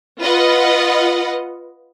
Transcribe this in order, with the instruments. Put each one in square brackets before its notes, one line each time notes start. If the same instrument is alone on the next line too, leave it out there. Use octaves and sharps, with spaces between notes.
[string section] F4 B4 D#5 F#5